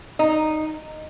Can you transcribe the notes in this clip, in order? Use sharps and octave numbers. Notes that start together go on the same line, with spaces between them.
D#4